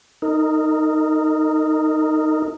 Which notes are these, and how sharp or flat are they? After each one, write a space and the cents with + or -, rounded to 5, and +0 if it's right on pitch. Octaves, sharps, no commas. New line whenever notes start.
D#4 +0 A#4 -20